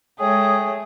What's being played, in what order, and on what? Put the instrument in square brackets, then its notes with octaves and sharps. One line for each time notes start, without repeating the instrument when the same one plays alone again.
[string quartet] G#3 A3 G#4 [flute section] C#5 G5 D#6